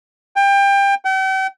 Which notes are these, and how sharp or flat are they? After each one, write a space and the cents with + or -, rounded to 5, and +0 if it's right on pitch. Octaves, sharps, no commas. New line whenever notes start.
G5 +25
G5 -45